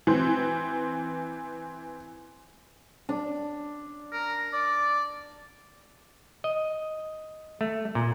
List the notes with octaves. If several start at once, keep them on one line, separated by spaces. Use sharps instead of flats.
E3 C4
D4
A#4
D5
D#5
A3
A#2